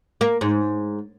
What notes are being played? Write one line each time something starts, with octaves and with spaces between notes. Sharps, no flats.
A#3
G#2